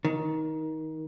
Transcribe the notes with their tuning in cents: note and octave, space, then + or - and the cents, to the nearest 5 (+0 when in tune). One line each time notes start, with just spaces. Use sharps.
D#3 +20